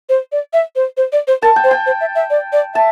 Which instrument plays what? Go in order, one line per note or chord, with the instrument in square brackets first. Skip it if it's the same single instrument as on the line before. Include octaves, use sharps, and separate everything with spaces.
[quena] C5
D5
E5
C5
C5
D5
C5
[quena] A#4 [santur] A5
[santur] G5
[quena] C5
[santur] G5
[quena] C5
E5
E5
D5
D5
[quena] E5 [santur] A5